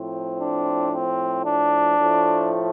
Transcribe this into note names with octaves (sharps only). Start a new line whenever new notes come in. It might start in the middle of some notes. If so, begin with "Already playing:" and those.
Already playing: A2 F3 C4
D4
C4
D4
A2 F3 A3